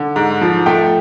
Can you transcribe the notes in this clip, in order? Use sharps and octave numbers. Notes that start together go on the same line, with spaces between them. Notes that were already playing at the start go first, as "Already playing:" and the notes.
Already playing: D3
G#2
F3
A3 G5